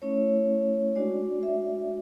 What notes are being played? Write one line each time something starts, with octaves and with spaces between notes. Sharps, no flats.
A3 C#4 E4 C#5
G#3 D4 F#4 D5
E5